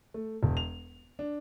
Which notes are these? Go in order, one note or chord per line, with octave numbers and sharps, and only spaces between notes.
A3
E1
F7
D4